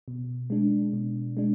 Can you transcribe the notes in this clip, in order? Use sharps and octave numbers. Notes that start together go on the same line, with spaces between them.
B2
G#3 D4
B2
G#3 D4